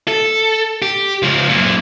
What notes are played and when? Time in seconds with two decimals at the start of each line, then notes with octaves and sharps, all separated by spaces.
0.08 A4
0.82 G4
1.22 C#2 F3
1.49 F#2 A#2